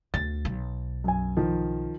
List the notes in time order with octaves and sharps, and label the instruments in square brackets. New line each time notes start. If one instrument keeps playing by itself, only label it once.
[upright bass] D2 [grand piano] A6
[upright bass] B1
[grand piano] F#2 G#5
D#3 F3